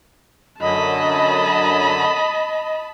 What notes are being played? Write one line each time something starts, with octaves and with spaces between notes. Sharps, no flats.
F#2 D3 F#3 D#5 A5 B5